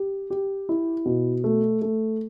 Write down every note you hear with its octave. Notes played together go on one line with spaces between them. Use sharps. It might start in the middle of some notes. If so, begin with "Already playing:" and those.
Already playing: G4
G4
E4
B2
A3
A3